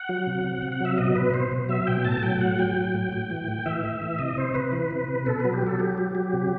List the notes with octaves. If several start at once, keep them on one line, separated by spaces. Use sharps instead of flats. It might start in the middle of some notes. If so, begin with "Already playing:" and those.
Already playing: F#5
F#3
C3
C3
C3
F#5
F#3 E5
B2 D#5
B2 B4
B2 C5
B2
F#3 E5
B2 G5
A2 A5
F#3 G5
A2 F#5
F#3 G5
F#3
A2
A2
E3
A2
E3 E5
A2
E3
C3 D#5
C3 C5
C3 B4
E3
C3
C3
B2 A4
F#3 B4
G4
F#3 A4
F#3 G4
F#3
F#3
C3